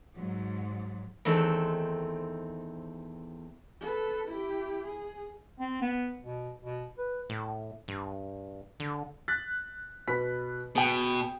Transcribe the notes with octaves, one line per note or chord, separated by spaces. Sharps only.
G#2 F#3
E2 D#3 A3 C4
A4 B4
E4 G4
G#4
C4
B3
B2
B2
B4
A2
G2
D3
F#6 A6 B6
B2 B4 B6
B2 G#4 G5